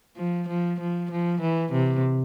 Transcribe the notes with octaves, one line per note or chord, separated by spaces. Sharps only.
F3
F3
F3
F3
E3
C3